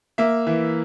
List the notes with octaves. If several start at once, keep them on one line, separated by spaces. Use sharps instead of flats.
A#3 E5
E3